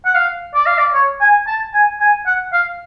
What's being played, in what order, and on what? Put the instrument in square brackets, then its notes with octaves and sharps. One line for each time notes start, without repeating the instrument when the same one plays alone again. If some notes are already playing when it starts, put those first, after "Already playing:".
[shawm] F#5
F5
D5
F5
D5
C#5
G#5
A5
G#5
G#5
F#5
F5